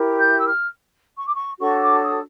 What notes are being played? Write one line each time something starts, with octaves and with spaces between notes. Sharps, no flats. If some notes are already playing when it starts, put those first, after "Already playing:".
Already playing: E4 G4 A#4
G6
E6
F6
C#6
D6
C#6
D4 F#4 A4 C#5 C#6
D6
D#6